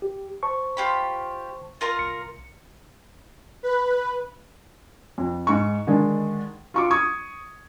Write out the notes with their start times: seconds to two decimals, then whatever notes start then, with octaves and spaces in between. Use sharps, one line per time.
0.02 G4
0.43 C5 A5 C#6
0.77 F4 G4 B5
1.81 F4 A#4 A#5
1.99 C2 C#7
3.63 B4
5.18 F2
5.47 G#2 C#6
5.87 D3 D#3 G#3 D4
6.74 F4 C#6 D6
6.91 C#6 D#6 G#6